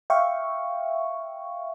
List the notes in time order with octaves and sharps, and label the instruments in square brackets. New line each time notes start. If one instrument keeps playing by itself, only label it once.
[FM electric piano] E5 F5 G5 C#6